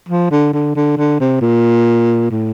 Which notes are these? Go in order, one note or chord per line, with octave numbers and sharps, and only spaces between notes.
F3
D3
D3
D3
D3
C3
A#2
A2